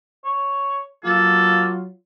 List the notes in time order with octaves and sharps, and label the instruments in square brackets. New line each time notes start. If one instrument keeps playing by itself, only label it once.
[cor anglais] C#5
[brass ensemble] F#3 F4 [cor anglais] A#3 [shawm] A4